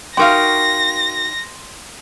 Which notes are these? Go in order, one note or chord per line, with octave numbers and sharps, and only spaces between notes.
D#4 F#4 A#4 F5 G5 C6 A#6